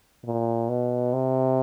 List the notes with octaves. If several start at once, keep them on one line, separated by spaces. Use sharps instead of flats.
A#2
B2
C3